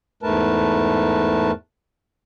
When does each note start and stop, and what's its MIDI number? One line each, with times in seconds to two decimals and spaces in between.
0.23 1.51 40
0.23 1.51 44
0.23 1.51 57
0.23 1.51 70
0.23 1.51 71
0.23 1.51 81